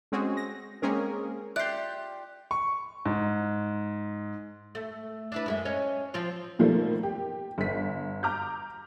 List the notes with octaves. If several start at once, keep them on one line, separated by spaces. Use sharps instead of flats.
G#3 C4 C#4 F#4 G#4
A#6
G#3 A#3 C4 C#4 G#4 A#4
F4 G4 D5 E5 F#6 C7
C#6
G#2
A3
D4 E4 B4
F#2 G#3 E5
C#4 C#5 D#5
F3 C4 F4
B2 D#3 F3 G3 A3 A#3
G4
G1 B6
A#5 D6 F6 G6